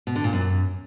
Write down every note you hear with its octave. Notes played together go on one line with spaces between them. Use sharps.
B2
D3
A#2
F#2